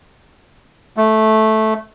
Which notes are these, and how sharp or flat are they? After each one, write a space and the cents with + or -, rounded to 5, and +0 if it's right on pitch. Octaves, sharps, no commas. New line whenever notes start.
A3 -10